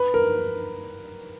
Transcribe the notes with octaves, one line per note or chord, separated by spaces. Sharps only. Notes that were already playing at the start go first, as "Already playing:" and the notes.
Already playing: B4
A#4